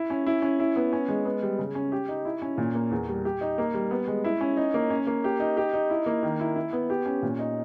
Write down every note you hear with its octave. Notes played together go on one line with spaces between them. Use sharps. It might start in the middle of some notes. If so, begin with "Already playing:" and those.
Already playing: E4
C#4
E4
C#4
E4
B3
C#4
G#3
B3
G3
C#3
C#4
G4
D#4
E4
C#4
A#2
A#3
E2
G3
G4
D#4
A#3
G3
B3
G#3
E4
C#4
D#4
A#3
C#4
A#3
G4
D#4
G4
D#4
E4
A#3
D#3
E4
E4
B3
G4
C#4
A#2
D#4